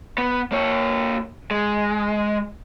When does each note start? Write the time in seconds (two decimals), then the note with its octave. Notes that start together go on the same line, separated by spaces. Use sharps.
0.18 B3
0.52 A#3 C#5
1.51 G#3